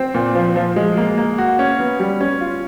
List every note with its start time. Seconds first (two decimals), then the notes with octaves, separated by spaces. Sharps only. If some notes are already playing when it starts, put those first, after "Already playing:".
Already playing: C4
0.14 A#2
0.35 F3
0.56 F3
0.76 G#3
0.97 A#3
1.18 A#3
1.38 F#4
1.59 C#4
1.79 B3
2.00 G3
2.21 C#4
2.41 F4